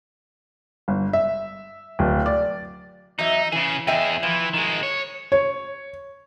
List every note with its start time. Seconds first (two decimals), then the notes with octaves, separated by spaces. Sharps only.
0.88 G1
1.13 E5
1.99 D1
2.26 D5
3.19 E2 F#3 D#4 E5
3.52 C#3 E3 G#4
3.87 E2 G#4 D#5 E5 G5
4.23 E3 F3
4.54 D#3 G#3
4.83 C#5
5.32 C#5